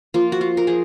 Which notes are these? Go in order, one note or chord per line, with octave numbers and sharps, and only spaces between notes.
F3 A#3 F4
F#4
F4
A#4
F3 G#4